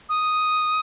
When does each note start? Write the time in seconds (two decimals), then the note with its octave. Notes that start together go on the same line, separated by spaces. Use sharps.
0.09 D#6